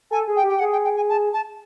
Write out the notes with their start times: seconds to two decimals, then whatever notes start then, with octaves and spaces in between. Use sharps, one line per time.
0.11 A4 G#5
0.28 G#4
0.36 G5
0.43 G4
0.49 G5
0.60 G#4 F#5
0.72 G5
0.84 G5
0.96 G#5
1.09 A5
1.33 A5